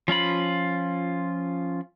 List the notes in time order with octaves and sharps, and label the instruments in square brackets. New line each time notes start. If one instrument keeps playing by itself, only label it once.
[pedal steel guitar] F3 C#4 F4 B5